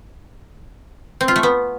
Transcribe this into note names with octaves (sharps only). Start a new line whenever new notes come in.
C4
F4
A3
B3